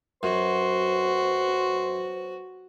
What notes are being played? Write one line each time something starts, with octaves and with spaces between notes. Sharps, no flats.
F#2 F#3 F#4 B4 C5 C6